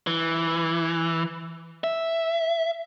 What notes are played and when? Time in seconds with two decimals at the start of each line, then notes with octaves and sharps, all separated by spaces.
0.07 E3
1.84 E5